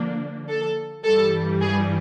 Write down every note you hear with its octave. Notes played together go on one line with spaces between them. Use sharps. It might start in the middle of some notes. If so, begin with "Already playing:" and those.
Already playing: D3 F3 A#3 D4
A4
G2 E3 G3 A4
G#4